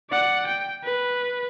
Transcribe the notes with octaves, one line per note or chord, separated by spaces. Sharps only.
D5 F#5
G5
B4